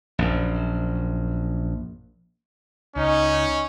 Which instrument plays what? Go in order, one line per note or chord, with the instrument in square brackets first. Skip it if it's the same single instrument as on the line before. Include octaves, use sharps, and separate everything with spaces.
[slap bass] A#1 F#2
[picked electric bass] C#2 [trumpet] C#4 [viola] D#4